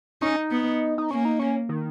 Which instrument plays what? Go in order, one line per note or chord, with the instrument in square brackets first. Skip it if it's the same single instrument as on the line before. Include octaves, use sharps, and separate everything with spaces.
[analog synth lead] C#4 [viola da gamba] D#4
[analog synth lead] D#4
[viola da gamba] B3
[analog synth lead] D#4
[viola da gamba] A#3 [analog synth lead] C#4
[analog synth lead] D#4
C#4
D#3